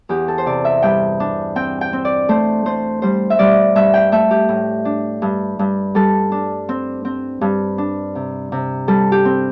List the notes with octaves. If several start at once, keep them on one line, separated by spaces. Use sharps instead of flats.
E2 G4
A4
C5
C3 D5
E5
G2 G5
D4
C4 G5
G5
C4
D5
A3 C5
A3 C5
G3 C5
E5
G3 D5
G2 E5
G5
A3 E5
G4
A2
D4
G2
G2
G3 A4
D4
C4
C4
G2
D4
C3
C3
G3 A4
G4
C4